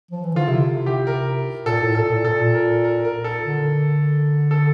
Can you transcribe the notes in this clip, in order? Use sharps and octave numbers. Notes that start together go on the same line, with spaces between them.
F3
E3
D3 F4
C3 E4
G4
A#4
A#2 A4
A2
A#2 A4
A#2
A#2 A4
A#4
A#4
A#4
A4
D3
A4